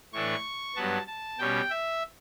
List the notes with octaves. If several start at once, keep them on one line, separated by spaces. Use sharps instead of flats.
A2 E3 A3 D4 C#6
G2 F#3 B3 A5
A5
B2 G3 C#4 G5
E5